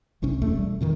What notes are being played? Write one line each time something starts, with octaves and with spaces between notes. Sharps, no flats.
G1 C2 C3 C#4
D#1 B1 E2 A3
G3
F2 A#2 D#3 E3